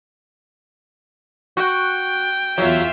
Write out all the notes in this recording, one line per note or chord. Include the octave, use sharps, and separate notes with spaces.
F#4 G5
E2 F#3 F4 E5